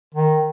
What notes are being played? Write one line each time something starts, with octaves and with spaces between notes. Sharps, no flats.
D#3